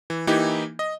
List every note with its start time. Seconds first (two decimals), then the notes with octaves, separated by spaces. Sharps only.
0.10 E3
0.27 E3 A#3 D#4 E4 G4
0.79 D#5